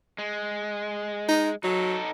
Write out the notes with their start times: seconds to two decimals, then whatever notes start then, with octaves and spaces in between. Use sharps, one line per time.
0.18 G#3
1.29 D#4
1.64 F#3 D#4 A4